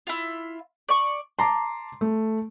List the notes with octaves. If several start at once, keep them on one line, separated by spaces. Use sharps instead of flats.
E4 F4
D5 C#6
A5 A#5 C6 D6
A3